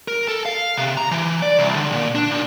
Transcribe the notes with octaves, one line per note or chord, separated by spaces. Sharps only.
A#4
A4
F5
C3
A#5
E3
D5
C2
D3
A#2
D4
A#2